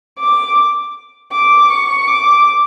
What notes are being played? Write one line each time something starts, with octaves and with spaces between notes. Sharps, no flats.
D6
D6
C#6
D6